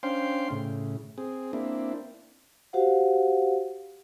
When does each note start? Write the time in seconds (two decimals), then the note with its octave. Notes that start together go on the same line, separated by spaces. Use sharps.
0.03 C#4 D4 C5 F5 G5 C6
0.51 A2 C#3
1.18 C4 G#4
1.53 A#3 C4 D4 E4
2.73 F#4 G4 C5 F5 F#5